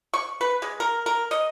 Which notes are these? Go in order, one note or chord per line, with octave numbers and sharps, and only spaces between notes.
C#6
B4
G#3
A#4
A#4
D#5